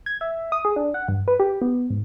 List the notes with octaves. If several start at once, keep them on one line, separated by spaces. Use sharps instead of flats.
G#6
E5
D#6
G#4
D4
F#5
G2
B4
G4
B3
G#2